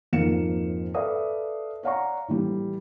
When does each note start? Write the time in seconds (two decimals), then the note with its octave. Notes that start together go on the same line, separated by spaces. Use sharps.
0.13 F2 G#2 A#3 F5 C#7 E7
0.94 A4 B4 D5 E5 F5 D#6
1.83 C#5 D5 F5 F#5 A#5 C#6
2.28 A2 E3 G3